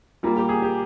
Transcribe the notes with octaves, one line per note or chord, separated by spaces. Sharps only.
A#2 G3 A#3 F4
G4
G#4
G4